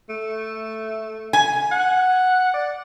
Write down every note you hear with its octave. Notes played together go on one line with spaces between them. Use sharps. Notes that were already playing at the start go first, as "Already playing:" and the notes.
A3
G#5
F#5
D5